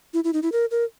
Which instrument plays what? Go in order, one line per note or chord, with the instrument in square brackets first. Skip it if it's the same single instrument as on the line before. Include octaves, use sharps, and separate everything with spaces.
[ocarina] E4
E4
D#4
E4
A#4
A#4